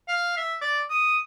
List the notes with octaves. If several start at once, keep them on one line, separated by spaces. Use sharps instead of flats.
F5
E5
D5
D#6